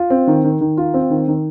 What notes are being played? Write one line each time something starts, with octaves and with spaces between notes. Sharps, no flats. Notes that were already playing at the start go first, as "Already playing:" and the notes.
Already playing: F4
C4
D#3
D#3
D#3
F4
C4
D#3
D#3